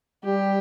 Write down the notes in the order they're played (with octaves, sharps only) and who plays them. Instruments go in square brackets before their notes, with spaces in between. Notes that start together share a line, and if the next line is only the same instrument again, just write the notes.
[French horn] G3 [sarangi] G4